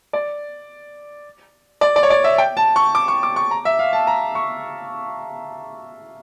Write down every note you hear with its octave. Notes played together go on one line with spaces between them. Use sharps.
D5
D5
D5
C#5
D5
E5
G5
A5
C#6
D6
C#6
D6
C#6
A#5
E5
F5
A5
A#5
C#6